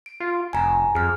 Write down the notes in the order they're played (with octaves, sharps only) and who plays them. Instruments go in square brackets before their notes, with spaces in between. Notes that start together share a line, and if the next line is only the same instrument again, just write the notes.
[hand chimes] D7
[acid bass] F4
[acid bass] F1 [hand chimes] G#5 A#5
[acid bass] F2 [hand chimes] G#4 F6